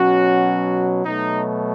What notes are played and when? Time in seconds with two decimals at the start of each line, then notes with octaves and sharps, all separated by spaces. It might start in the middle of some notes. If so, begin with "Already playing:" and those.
Already playing: B2 F#3 C#4 F#4
1.05 B2 F#3 A3 D#4